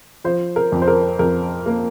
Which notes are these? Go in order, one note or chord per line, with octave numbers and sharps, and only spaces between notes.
F3 C5
A#4
F2
C5
A#4
F2 A#4
A#3